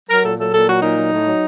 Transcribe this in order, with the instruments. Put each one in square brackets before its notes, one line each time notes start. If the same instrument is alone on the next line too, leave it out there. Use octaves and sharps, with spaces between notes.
[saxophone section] F#3 A#4
A#2 A4
F#3 A4
A#2 A4
F#3 F#4
A#2 D#4
F#3
A2
F#3